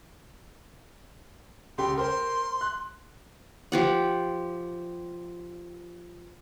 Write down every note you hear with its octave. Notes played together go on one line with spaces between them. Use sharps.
C#2 G4 G5 C6
A#4 C5 C6
F#6
F3 G4 F#5